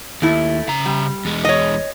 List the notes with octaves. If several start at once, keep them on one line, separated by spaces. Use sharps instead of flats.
D#2 A3 E4
C#3 A#5
G3
E2 G#3
C#5 D#5